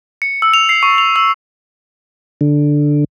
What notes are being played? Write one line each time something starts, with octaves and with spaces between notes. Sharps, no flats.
C#7
E6
F7
C7
C#6
F7
E6
D3